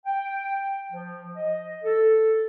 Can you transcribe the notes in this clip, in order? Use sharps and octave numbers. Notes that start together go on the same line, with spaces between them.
G5
F3
D#5
A4